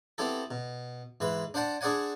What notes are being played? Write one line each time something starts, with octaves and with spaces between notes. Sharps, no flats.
B3 C4 E4 G4 A4
B2
G#2 E3 B4 C6
D4 C5 F#5 G5 A5
D4 G#4 C5 D5 F#5 G#5